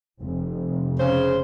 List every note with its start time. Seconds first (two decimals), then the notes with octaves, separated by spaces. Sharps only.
0.21 F1
0.99 C#3 C5